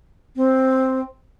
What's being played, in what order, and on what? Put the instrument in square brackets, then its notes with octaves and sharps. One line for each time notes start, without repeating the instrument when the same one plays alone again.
[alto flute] C4